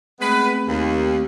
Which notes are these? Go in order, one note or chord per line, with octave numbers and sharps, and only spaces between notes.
G#3 A3 B3 C4 B4
D#2